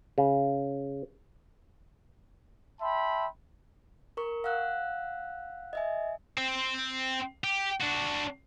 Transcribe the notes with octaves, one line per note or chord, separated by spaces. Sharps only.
C#3
E5 G5 A5 B5 C6
A#4 C#6
F5 F#5 E6 F#6
D#5 E5 G#5
C4 C5
G4
D4 F#4